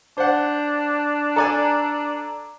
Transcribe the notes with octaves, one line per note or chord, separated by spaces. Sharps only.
D4 C5 F#5
A4 D5 G#5 A#5